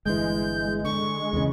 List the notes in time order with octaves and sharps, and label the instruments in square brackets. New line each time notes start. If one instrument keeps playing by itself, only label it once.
[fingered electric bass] G1 E3 [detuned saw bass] G#3 [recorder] G6
[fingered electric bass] D3 [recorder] C#6
[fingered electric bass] E2 C#3